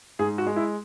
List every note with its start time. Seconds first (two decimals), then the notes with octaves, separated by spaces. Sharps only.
0.19 G#2 G#4
0.38 F#4
0.47 G#3
0.56 E4